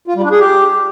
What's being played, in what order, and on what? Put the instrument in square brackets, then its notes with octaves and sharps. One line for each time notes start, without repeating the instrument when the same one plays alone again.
[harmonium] F4
G3
D4
G#4
G4